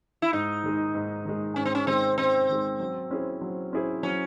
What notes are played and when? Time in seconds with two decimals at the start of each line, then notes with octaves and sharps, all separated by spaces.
0.22 E4
0.33 G#2 D#4
0.63 D#3 G#3
0.95 G#2
1.25 D#3 G#3
1.56 G#2 C#4
1.65 C4
1.75 C#4
1.87 D#3 G#3 C4
2.18 G#2 C4
2.50 D#3 G#3
2.80 F#3
3.11 C#4 E4 G#4 C5
3.42 F#3
3.73 C#4 E4 G#4 C5
4.03 F#3 C#4